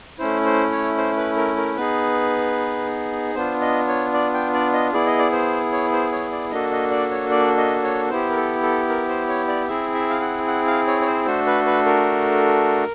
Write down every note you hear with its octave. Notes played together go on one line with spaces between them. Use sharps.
A3 C#4 E4 C5
C5
C#5
C5
B4
A#4
A#4
B3 D#4 G#4 B4
B3 D4 F4 C5
D#5
C#5
D5
G5
D5
D#5
B3 E4 G#4 D5
D#5
D5
C5
C#5
C5
C#5
D5
A#3 D4 F#4 A4 D#5
D#5
D5
C#5
D5
D#5
C#5
B3 E4 G4 C5
A#4
A4
A4
A#4
C5
C#5
D5
C4 E4 G#4 E5
E5
F5
F#5
F#5
F5
C#5
C#5
C5
A3 D4 F#4 A4 C5
B4
B4
A#4